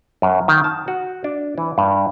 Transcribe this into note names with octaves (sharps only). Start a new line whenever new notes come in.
F#2
D#3
A5
F#4
D4
E3
G2